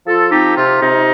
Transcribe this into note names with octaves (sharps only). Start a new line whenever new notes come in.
F3 F4 A4
C4 D#4 G4
C3 F4
C3 D#4